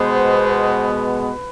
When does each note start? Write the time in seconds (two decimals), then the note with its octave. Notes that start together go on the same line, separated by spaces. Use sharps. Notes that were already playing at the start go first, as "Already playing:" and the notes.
Already playing: B2 G#3 B3 C5
0.82 B4